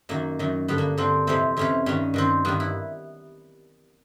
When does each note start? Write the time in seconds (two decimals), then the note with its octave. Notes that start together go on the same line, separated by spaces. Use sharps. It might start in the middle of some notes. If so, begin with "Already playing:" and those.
0.09 F#2 D#3 A#3
0.39 F#2 D#3
0.68 G2 D3 B3
0.78 A#3
0.97 G2 D3 C4
1.27 F2 C3 E3 C4
1.57 F2 C3 E3 C#4
1.86 G2 D#3 C#4
2.14 G2 D#3 C4
2.45 G2 D#3 B3
2.60 E4